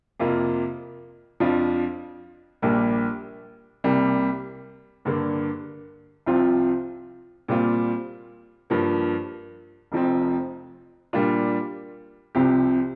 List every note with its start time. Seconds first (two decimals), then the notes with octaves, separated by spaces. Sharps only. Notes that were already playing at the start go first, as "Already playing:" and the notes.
0.20 F2 C3 A#3 F4
1.40 F2 F3 D4 F4
2.62 A#1 A#2 G3 A#3
3.84 C2 C3 G3 A#3
5.05 G2 D3 A#3
6.26 C2 C3 F3 C4 F4
7.48 A#2 G3 C4 F4
8.70 G2 F3 A#3
9.92 F1 F2 F3 C4
11.13 A#2 G3 A#3 D4 F4
12.35 C2 C3 F3 C4 G4